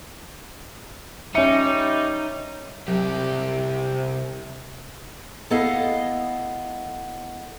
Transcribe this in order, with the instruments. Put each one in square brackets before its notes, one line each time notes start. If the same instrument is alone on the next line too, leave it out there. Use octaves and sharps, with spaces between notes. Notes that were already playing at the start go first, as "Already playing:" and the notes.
[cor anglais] G3 [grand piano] C#4 C#7 [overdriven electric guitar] D#4 [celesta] E5
[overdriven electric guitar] C2 G4 [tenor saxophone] C3 [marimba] F#3
[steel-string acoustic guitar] A3 B3 E4 A4 D#5 F5